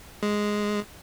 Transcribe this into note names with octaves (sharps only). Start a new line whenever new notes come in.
G#3